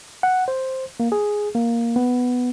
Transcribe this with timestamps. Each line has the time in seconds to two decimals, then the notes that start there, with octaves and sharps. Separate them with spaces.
0.23 F#5
0.48 C5
1.00 A#3
1.12 G#4
1.55 A#3
1.96 B3